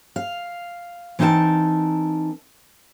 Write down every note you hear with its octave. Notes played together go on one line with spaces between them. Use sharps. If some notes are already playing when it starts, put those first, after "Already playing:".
F5
E3 C4 D#4 E4 A#4 A5